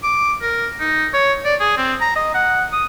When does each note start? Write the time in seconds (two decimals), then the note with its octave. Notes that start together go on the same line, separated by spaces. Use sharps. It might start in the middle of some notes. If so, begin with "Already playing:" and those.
0.03 D6
0.42 A#4
0.80 D#4
1.13 C#5
1.45 D5
1.60 G#4
1.77 C4
2.01 A#5
2.16 D#5
2.34 F#5
2.72 D#6